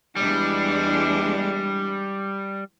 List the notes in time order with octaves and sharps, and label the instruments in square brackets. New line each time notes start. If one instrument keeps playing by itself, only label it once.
[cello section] E2 G#3 D4 [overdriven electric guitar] G3